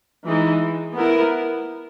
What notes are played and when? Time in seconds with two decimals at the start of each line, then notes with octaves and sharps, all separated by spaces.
0.25 E3 G#3 D#4
0.95 B3 E4 A#4